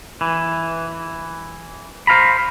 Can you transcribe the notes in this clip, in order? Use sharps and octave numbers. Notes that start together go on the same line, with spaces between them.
E3
C5 F5 A#5 B5